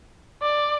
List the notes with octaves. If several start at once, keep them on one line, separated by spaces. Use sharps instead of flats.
D5